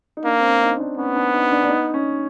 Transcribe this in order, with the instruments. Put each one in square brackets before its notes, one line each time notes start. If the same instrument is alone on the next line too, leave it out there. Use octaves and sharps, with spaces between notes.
[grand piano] D#4
[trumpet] A#3 [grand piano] D4
[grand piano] C4
C#4
D#4
D4
[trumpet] B3 [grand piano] C#4
[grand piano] D4
D#4
D4
D4
D#4
C#4